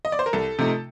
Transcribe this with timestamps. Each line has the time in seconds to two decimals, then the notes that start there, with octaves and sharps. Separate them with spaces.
0.05 D#5
0.12 D5
0.19 C5
0.26 A#4
0.33 C2 A4
0.59 C3 F3 A3 D#4